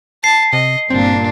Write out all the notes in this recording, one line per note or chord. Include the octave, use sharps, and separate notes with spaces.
A5 C7
C3 D#5
G1 A#2 C4 D4